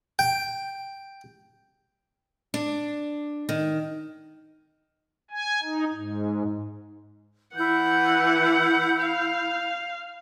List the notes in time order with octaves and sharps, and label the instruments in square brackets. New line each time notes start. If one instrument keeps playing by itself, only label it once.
[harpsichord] G5
[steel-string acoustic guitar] D4
D#3
[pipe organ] G#5
D#4
G#2
[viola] E3 F#5 [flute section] E4 G6
[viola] F5